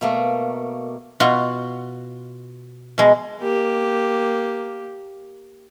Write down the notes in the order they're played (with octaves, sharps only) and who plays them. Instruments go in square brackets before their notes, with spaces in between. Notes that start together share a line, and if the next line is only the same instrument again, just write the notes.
[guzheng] B2 A3 A#3
B2 F4 F#4
B2 G#3
[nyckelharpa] A#3 G4